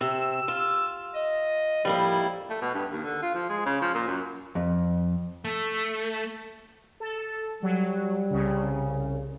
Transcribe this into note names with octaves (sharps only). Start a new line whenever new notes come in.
C3 E6
F4
D#5
F2 A2 F3 G3 A#3 E4
A3
B2
G2
D#2
D3
F4
F3
G#3
C#3
F3
A#2
F#2
F2
A3
A4
F#3 G3
C2 C#3